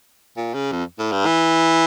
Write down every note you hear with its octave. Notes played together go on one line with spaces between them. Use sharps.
A#2
C#3
F2
A2
G2
E3